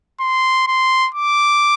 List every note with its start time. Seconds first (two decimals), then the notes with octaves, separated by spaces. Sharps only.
0.20 C6
0.67 C6
1.14 D6